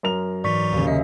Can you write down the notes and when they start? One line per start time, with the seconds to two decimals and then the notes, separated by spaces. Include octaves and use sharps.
0.03 F#2 A#4 F7
0.44 G#2 E3 F#3 D5 C#6 B6
0.73 D#2 C#3
0.87 C3 C#4 D#5 E5